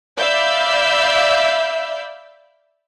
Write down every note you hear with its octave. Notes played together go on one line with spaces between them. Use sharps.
D5 E5 F5 B5 E6 G6